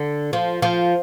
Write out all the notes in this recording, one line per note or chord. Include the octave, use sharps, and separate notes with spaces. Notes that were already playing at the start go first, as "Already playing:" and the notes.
Already playing: D3
F3
F3